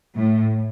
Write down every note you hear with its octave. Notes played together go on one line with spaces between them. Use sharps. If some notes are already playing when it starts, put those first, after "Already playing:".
A2